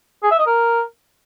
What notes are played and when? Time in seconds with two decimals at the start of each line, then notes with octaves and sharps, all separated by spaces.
0.23 G#4
0.31 E5
0.39 D#5
0.46 A#4